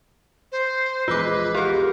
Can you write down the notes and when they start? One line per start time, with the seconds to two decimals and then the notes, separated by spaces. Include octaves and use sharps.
0.52 C5
1.08 A#1 E2 G#3 F4 B4 D6
1.55 G4 G#4 A#4